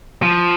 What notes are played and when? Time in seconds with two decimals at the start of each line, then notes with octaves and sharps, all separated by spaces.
0.22 F3